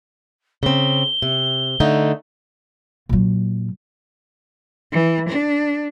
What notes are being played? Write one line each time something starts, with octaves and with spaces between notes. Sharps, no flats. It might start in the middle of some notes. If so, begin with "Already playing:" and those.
C#3 C4 G7
C3
D3 A3 D#4
A#2 F#3
E3
D4